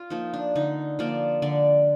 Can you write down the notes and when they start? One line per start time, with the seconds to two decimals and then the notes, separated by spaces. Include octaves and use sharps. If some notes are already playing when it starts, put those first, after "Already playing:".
Already playing: F4
0.10 F3 A#3 D#4
0.34 D4
0.55 D3 D#4
0.99 F3 A#3 D5
1.42 D3 D5